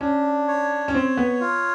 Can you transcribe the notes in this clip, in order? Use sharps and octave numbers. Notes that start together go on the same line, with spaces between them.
C#4 D4
C#5
C#4
C4 C#5
B3
F4